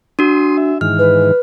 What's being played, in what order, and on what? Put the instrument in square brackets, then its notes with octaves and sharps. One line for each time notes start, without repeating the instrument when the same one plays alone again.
[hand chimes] D4 F#4 [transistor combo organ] C6 D#6
[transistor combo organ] E5
[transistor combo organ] G#2 D#3 E3 [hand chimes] F6
[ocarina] B4